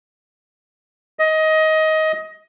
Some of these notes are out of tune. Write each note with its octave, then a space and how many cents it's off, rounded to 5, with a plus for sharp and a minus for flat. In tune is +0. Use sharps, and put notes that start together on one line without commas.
D#5 +20